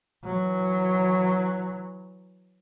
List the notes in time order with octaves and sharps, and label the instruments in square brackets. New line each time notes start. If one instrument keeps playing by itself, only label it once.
[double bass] E3 F#3